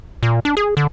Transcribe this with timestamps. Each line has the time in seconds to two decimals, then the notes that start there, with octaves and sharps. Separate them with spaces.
0.23 A#2
0.45 D4
0.57 G#4
0.77 D3